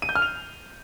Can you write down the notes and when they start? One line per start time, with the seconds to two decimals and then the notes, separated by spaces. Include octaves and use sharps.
0.02 D#7
0.09 G6
0.15 F6
0.22 F7